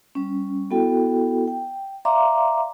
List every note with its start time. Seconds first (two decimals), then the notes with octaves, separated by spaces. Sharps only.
0.15 G3 C#4
0.71 B3 E4 F#4 A4 G5
1.48 G5
2.05 D5 E5 F5 A#5 C6 D6